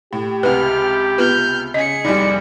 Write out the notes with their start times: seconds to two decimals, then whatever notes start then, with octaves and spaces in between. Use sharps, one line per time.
0.13 A2 G4
0.43 C#2 C3 B4 F#5 F6
1.18 B3 F4 B4 F6 G6
1.74 C#3 G#4 D#5 B6 C#7
2.05 F1 A#1 G3 D#4 D5